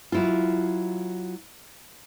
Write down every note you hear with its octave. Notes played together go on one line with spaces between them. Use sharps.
F#3 E4 F4